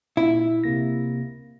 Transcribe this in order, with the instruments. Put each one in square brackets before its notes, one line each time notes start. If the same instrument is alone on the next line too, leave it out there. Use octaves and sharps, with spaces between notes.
[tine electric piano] A#2 [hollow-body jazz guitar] E4
[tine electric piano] C3 A#3 A#6